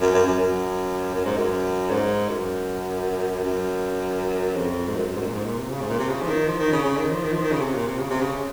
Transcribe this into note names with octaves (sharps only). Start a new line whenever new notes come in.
F#2
F#2
F#2
F#2
F#2
G#2
F#2
G#2
F#2
F#2
F2
G#2
F#2
F#2
G#2
F#2
A#2
G#2
A#2
C3
C#3
G#2
A#2
C3
C#3
F3
D#3
F3
D#3
C#3
C#3
D#3
F3
D#3
F3
D#3
C#3
C3
A#2
C3
C#3
C3
C#3